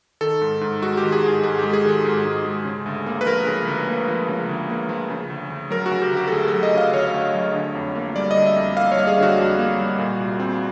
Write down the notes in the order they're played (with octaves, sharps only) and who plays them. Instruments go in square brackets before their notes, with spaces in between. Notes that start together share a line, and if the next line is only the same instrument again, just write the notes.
[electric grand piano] D#3 A4
G#2
G#2
G#3 F#4
D#3 G4
G#4
G#2
G#4
G#2 G#4
G#3 G4
G#4
D#3 A4
G#2
G#2
G#3
C#3
D2
A#3
B4
F3 A#4
C#3
D2
A#3
F3
C#3
D2
A#3
F3
C#3
D2
D2
F#3 A#4
F#4
C#3
G4
D2
G4
A4
D2 G#4
A4
F#3
D#5
C#3 F5
D2 C#5
D2
F#3
D3
F2
A#3
G3 D5
D#5
D3
E5
F2
A#3 F5
C#5
G3
G#4
D3 F#4
F2
A#3
G3
A#2
C2
C4